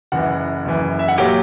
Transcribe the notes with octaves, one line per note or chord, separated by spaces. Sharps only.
F#1 F#2 E3 F#5
F#1 F#2 E3
E5
F#5
A#2 F#3 C#4 G4 G5